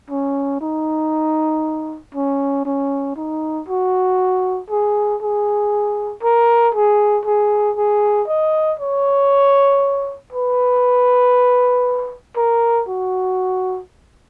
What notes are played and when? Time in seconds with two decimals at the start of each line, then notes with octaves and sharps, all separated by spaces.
0.11 C#4
0.61 D#4
2.15 C#4
2.66 C#4
3.16 D#4
3.68 F#4
4.70 G#4
5.22 G#4
6.23 A#4
6.75 G#4
7.25 G#4
7.77 G#4
8.28 D#5
8.80 C#5
10.33 B4
12.37 A#4
12.89 F#4